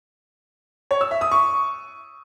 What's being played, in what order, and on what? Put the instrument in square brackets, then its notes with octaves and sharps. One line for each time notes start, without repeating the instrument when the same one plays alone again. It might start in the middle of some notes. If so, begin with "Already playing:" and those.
[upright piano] C#5
E6
E5
D#6
C#6